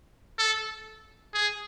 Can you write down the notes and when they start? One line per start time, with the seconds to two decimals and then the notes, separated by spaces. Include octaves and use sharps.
0.38 A4
1.34 G#4